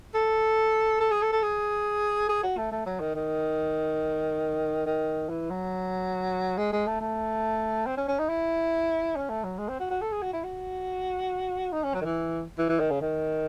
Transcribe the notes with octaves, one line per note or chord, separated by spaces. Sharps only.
A4
A4
G#4
A4
A4
G#4
G#4
F#4
A3
A3
F#3
D#3
D#3
D#3
E3
F#3
G#3
G#3
A3
A3
C4
C#4
C#4
D#4
E4
C#4
A3
F#3
G#3
C4
F#4
F#4
A4
G#4
F#4
E4
F#4
D#4
C#4
F#3
D#3
E3
E3
E3
D#3
C#3
D#3